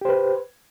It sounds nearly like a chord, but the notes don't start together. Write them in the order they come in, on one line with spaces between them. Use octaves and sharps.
G4 C5 B4